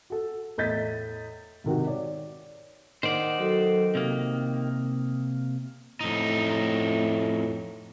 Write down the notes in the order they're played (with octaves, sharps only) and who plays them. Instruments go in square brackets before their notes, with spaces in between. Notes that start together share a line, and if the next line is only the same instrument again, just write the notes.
[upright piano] F#4 A4
E2 A2 D#5 G6 A6 B6
G#2 C3 D#3 F#4
C#5 D5
[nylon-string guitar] D#3 [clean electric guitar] C5 D5 [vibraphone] F#5
[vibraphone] F#3 F#4 A4
[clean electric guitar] C3 A#3 [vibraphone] D#6
[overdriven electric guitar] F2 D#4 [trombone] A2